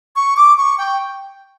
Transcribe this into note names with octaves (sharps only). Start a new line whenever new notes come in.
C#6
D6
C#6
G5